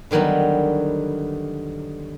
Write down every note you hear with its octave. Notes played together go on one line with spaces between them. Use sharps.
D3 D#3 F#3 G3 B3